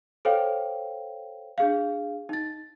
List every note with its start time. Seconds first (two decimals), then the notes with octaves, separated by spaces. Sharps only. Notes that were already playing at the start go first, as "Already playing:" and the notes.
0.25 A4 C5 C#5 F5 G5
1.58 D4 G#4 F5
2.29 D#4 A6